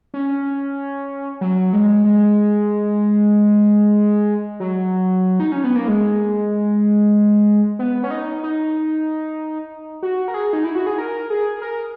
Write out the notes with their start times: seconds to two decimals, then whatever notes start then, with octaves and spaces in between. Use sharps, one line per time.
0.14 C#4
1.41 F#3
1.73 G#3
2.04 G#3
4.60 F#3
5.40 D#4
5.52 C#4
5.64 B3
5.76 A#3
5.88 G#3
7.79 B3
8.04 C#4
8.11 D#4
8.43 D#4
10.03 F#4
10.28 A#4
10.34 G#4
10.53 D#4
10.64 E4
10.75 F#4
10.86 G#4
10.98 A#4
11.30 G#4
11.62 A#4